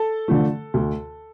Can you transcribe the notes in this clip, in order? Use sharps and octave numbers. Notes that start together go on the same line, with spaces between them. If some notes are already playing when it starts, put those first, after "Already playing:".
Already playing: A4 A5
D3 F3 A3
D2